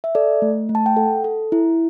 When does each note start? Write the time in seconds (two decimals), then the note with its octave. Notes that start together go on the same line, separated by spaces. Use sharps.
0.04 E5
0.15 A4 D5
0.42 A3
0.69 A3
0.75 A5
0.86 G5
0.97 A4 F#5
1.24 A4
1.52 E4